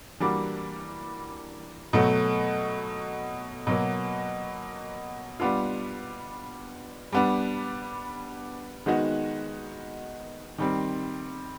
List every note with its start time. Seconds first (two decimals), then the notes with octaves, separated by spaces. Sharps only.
0.20 E3 G3 A#3 D4 F#4
1.93 B2 F#3 A3
3.67 B2 F#3 A#3
5.40 G3 B3 D4 F4
7.12 G3 B3 D4
8.86 D#3 G#3 B3 D#4 F#4
10.58 D#3 G3 C4